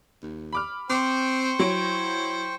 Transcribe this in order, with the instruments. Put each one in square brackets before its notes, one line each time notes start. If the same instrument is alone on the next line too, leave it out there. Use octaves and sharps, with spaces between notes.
[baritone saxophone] D#2
[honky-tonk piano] B5 D6 F6
[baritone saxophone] C4 [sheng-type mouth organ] C5 G5 C#6 [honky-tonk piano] D6
[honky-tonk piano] F#3 C#5 D7 [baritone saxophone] E4